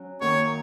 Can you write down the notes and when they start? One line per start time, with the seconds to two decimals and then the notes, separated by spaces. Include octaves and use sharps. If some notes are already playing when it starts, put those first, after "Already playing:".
Already playing: F#3 C#4 F#4
0.21 F#2 D#3 A#3 C#5